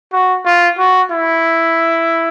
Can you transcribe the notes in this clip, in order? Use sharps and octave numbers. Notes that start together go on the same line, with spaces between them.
F#4
F4
F#4
E4